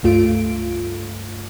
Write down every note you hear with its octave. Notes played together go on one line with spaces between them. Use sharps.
C#2 G2 A3 F4 D7